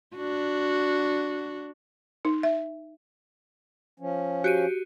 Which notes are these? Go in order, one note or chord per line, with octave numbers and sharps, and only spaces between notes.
D4 F#4
D#4
E5
F3 C#4
F#4 G4 D#7